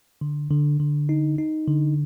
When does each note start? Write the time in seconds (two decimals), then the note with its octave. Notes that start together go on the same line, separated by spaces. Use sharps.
0.21 D3
0.51 D3
0.80 D3
1.09 D#4
1.38 D#4
1.68 D3